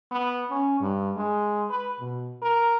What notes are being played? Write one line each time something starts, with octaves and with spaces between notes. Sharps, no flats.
B3
C#4
G2
G#3
B4
B2
A#4